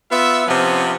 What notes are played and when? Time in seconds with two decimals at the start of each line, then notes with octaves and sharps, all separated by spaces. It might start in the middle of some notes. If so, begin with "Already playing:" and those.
0.11 B3 F4 E5
0.47 C3 F3 B3 C#4